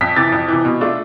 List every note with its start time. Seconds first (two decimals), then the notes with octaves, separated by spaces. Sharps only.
0.01 F2 B6
0.16 C3 E3 A6
0.32 F2
0.48 C3 E3
0.65 B2
0.81 A3 D4 F4